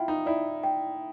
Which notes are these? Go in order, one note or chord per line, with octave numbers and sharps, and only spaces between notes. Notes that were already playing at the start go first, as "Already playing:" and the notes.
Already playing: E4 F4 G5
D#4
E4 D5
G5